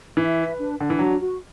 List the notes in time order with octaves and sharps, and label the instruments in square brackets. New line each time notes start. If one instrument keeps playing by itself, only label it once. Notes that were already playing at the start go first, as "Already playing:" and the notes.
[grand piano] E3 [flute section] E5
[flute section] B4
D4
[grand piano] D3 [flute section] D4
[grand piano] E3
[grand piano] F#3 [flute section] F#4
[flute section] F#4